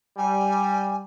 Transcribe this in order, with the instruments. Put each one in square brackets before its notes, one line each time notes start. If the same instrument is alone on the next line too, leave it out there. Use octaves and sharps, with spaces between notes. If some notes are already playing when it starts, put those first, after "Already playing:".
[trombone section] G3 [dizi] G#5